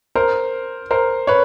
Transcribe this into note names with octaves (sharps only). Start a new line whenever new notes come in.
A#4 C5
A#4 C5
B4 C#5